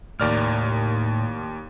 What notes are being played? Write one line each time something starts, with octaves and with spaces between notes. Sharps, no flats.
D#2 A2 A#4 D5 F6